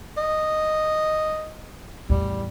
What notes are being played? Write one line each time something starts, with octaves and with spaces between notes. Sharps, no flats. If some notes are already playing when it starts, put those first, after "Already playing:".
D#5
E2 A2 G3